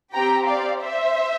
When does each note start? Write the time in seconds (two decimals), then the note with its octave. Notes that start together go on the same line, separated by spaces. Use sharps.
0.14 C4 G4 G5 A#5
0.48 D5 F5
0.81 C5 E5